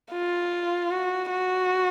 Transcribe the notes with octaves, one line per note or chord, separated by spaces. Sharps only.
F4
F#4
F#4